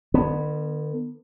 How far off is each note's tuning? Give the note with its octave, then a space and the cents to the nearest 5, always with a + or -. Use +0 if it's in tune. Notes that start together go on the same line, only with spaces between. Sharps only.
D3 +45 B3 +0